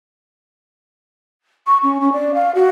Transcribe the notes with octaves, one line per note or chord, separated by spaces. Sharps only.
C#6
C#4
C#4
D5
F5
F#4